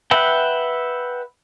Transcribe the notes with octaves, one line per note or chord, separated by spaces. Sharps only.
B4 E5 F#5 G5